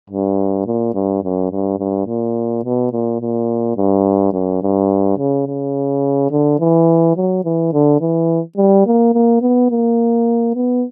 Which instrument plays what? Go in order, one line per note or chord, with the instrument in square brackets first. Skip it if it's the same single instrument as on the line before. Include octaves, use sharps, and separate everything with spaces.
[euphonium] G2
A#2
G2
F#2
G2
G2
A#2
B2
A#2
A#2
G2
F#2
G2
C#3
C#3
D3
E3
F#3
E3
D3
E3
G3
A#3
A#3
B3
A#3
B3